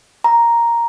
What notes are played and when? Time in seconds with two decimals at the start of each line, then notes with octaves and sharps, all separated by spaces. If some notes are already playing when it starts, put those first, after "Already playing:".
0.24 A#5